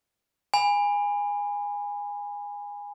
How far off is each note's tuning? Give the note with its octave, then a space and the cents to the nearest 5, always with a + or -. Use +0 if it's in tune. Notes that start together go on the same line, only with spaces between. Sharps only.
G#5 -20 B5 +5